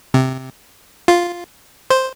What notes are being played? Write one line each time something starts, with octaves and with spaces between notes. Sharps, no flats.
C3
F4
C5